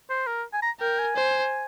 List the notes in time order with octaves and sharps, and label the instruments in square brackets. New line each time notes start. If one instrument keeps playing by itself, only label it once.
[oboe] C5
A#4
G#5
A#5
[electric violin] A#4 [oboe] G5
[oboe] G#5
[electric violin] C5